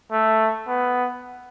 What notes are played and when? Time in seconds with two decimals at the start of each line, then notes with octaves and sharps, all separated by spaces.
0.12 A3
0.67 B3